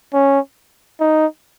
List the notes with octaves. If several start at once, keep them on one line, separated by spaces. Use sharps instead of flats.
C#4
D#4